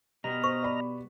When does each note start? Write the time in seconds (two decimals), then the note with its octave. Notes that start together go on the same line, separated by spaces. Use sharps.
0.24 B2 G3 B3 D#5 A#5 F6
0.44 C5 C#6
0.63 D5 B5